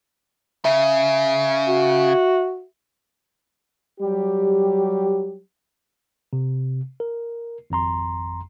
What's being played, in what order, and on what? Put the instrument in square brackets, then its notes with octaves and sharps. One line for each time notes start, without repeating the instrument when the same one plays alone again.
[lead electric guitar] C#3 [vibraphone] E5
[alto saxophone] F#4
[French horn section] F#3 G3 G4
[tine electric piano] C3
A#4
G#1 F2 A#5 C6